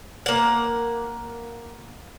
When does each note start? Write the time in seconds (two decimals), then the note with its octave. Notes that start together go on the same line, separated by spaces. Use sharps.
0.26 A#3 F#5